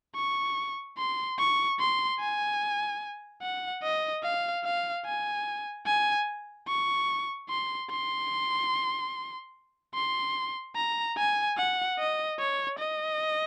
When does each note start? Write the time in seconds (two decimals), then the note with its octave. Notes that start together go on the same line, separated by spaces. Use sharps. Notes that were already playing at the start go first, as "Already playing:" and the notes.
0.15 C#6
0.98 C6
1.39 C#6
1.80 C6
2.20 G#5
3.42 F#5
3.83 D#5
4.23 F5
4.64 F5
5.06 G#5
5.86 G#5
6.68 C#6
7.49 C6
7.91 C6
9.95 C6
10.76 A#5
11.17 G#5
11.57 F#5
11.99 D#5
12.39 C#5
12.79 D#5